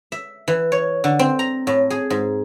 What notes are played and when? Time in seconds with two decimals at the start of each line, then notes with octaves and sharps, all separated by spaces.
0.12 E5
0.48 E3
0.72 C#5
1.04 D3
1.19 C4
1.39 A#5
1.67 A2
1.90 G#4
2.10 G#2